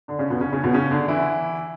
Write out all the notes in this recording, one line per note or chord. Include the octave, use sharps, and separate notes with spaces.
D3 D4
C#3 C#4
B2 B3
C#3 C#4
C#3 C#4
B2 B3
C#3 C#4
D3 D4
E3 E4